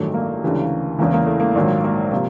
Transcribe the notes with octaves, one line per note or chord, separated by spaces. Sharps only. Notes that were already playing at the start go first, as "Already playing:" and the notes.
Already playing: A1 G2 D#3 F#3 A3
A#3
D2 C#3 E3 G3
E2 C#3 E3 A#3
A#3
A3
A#3
A#1 G#2 D#3 F#3
A#3
C3 F3 A#3